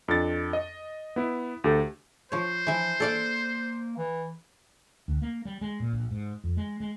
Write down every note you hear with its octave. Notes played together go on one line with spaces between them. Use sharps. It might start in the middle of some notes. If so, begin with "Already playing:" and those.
F2 D4 A6
D#5
B3 E4
D2 G4 A4
F3 C5 C#5
E3 F3 E5
A#3 A4 D5 F5
E3
D2
A#3
G3
G#3
A#2
A#1
G#2
F2
G#3
G#3